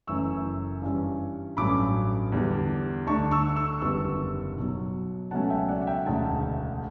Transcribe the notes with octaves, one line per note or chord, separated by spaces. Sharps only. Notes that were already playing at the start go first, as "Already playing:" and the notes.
F#1 F#2 E3 A3 C#4 C#6 E6
G2 E3 G3 C#4
A1 G2 F#3 A3 C#4 B5 D6
E2 D3 G3
D2 D3 A3 D4 A5 C#6
C#6 E6
C#6 E6
F#1 E2 D3 G3 B3 C#6 E6
B1 B2 F#3
C#2 B2 F#3 A3 C#4 F#5 A5
E5 G5
D5 F#5
F#5
E5 G5
E1 D2 C#3 F#5 A5